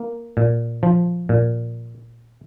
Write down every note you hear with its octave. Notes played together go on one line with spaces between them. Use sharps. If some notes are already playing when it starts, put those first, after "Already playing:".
Already playing: A#3
A#2
F3
A#2